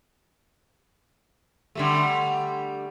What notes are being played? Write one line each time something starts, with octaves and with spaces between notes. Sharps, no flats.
D3 G3 A3